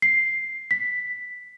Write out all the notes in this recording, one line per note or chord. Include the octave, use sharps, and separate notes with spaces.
C7
B6